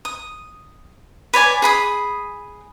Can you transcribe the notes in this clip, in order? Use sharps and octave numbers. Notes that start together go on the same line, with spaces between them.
D#6
B4 C#5 D5 G#5
G#4 B5 D#6